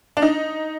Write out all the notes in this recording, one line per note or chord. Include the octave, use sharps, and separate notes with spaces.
D4
D#4